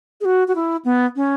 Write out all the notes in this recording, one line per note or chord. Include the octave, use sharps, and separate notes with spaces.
G#4
F#4
F#4
E4
B3
C#4